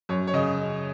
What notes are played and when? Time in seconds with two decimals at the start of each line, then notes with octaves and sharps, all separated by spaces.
0.09 F#2 C#5
0.27 C#5
0.34 C#3 D#5